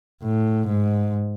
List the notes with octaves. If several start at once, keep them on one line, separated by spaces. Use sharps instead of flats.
A2
G#2